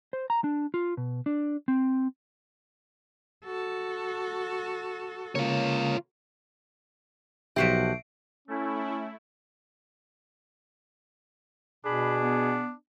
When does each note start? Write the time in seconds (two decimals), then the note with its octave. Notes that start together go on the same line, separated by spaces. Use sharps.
0.13 C5
0.30 A#5
0.44 D4
0.74 F4
0.97 B2
1.26 D4
1.68 C4
3.45 F#4 A4
5.35 C#3 A#3 F4 C#5
7.56 B1 F3 F#4 G4 E5 C7 D7
8.48 A3 C#4 E4
11.85 B2 D4 G#4 B5
12.22 B3